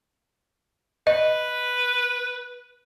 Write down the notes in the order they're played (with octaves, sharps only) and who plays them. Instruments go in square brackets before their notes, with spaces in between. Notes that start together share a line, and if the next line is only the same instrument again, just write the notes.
[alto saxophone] B4 [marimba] D#5